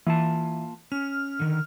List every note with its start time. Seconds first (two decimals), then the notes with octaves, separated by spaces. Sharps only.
0.07 E3 A#3 F4 A5
0.92 C#4 F6
1.40 D3 D#3